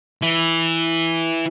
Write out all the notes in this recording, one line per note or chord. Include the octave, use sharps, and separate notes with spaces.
E3 E4